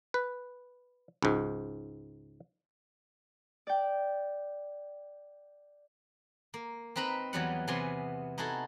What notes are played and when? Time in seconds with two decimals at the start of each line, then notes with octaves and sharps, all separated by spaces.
0.14 B4
1.23 C#2 G#2
3.67 D5 G5
6.54 A#3
6.96 C4 D#4 B4 A#5 B5
7.33 E2 E3 F#3 G3 B3 F#5
7.67 E2 C3 B3 G#5 C6
8.38 D#4 E4 F#4 G#4 A4